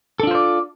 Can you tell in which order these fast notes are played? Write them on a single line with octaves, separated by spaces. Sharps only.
A4 D4 F4 C5 D5